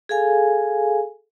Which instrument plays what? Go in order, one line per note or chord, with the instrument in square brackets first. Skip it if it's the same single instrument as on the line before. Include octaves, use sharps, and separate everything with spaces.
[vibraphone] G#4 A4 F5 G#5